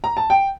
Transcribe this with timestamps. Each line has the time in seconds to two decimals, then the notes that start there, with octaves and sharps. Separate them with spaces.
0.04 A#5
0.17 A5
0.30 G5